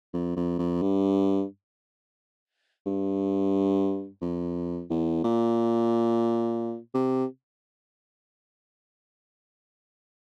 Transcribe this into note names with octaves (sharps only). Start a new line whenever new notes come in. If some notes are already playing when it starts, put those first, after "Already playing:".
F2
F2
F2
G2
G2
F2
E2
A#2
C3